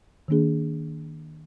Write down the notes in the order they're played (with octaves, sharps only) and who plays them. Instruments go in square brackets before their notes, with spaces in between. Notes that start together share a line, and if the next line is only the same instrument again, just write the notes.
[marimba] D#3 A#3 D4 G#4